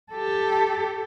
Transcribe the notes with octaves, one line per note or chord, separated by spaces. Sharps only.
G4 A4